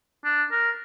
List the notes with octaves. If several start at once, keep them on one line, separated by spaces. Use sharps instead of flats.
D4
A#4